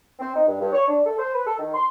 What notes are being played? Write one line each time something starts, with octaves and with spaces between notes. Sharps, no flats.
C4
D#4
G2
G2
C#5
D4
A4
C5
B4
A4
D#3
C6